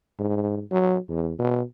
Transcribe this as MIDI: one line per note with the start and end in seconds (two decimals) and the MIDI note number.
0.19 0.62 44
0.71 0.98 54
1.09 1.32 40
1.39 1.62 47